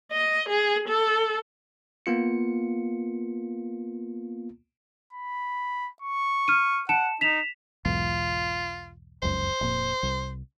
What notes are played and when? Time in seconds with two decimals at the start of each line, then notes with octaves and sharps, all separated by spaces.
0.12 D#5
0.49 G#4
0.88 A4
2.06 A#3 B3 F4 C#7
5.13 B5
6.02 C#6
6.48 F6 D#7
6.89 F#5 A5 C#7 E7
7.21 D#4 B6 E7 F7
7.85 B1 E2 G#2 F4
9.22 F1 C#2 F#2 C5
9.61 F1 A#2
10.03 C2